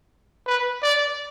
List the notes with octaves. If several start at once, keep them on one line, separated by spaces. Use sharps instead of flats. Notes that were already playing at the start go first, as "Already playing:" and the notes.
B4
D5